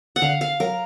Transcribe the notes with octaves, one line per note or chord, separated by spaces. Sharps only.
F#5
D3 F5
F5
F#3 A#4